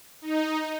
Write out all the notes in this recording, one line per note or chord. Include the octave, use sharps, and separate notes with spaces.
D#4